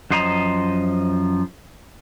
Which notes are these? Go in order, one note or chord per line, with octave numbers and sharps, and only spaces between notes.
F#2 F3 C5 D#5 A#5